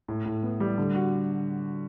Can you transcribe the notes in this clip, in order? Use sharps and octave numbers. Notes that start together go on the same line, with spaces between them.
A2
A2
B3
G3
D3
F#4